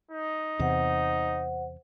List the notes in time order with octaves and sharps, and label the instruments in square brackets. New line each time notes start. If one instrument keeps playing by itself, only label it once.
[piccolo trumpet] D#4
[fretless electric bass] E2 C3 [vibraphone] C5 F#5